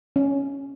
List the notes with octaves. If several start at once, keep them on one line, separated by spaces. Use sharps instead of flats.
C#4